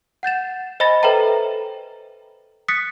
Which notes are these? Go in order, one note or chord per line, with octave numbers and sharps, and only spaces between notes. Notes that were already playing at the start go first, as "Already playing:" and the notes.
F#5 G6 A6 E7
C5 D#5 G#5 B5 A6 A#6
A4 B4 C5 E5 G5 A#5
D#6 F#6 A6 B6 C#7